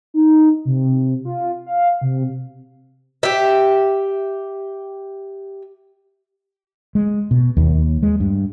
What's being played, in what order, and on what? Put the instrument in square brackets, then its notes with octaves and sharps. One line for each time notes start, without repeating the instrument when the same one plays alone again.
[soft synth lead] D#4
C3
F4
F5
C3
[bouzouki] G4 E5
[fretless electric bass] G#3
B2
D#2
G#3
G2